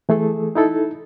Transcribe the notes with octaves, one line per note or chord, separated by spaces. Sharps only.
E3 A3 G#4 A4
D#4 E4 A4